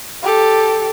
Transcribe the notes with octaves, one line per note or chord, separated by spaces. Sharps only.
G4 A4